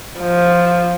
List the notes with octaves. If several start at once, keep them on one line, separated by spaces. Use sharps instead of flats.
F3